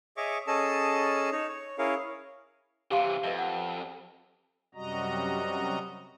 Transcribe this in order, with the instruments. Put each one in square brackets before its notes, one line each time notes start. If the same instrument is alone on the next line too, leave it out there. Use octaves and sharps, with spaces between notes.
[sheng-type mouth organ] G#4 C#5 D#5 E5 C#6 D6
C#4 G#4 A4 D#5 A5 E6
D#4 C#5
C#5
C#4 E4 G#4 A#4 C#5 F5
[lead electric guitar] C3 E3 [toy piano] G4 F5 C6
[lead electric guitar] F2 [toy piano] B4 D#5 E5
[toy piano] F#5
[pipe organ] F#2 C3 G3 F#4 D#5 A#5